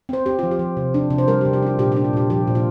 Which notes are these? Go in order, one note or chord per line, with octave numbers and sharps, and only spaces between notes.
C4 C5
C4 G4
F3 F4
G4
F3
C3
D4
C3
C5
G3 A#4
G4
C3
G4
D4 F4
A#2 G4
D4 G4
F4
A#2 G4
F3 G4
A#2
F4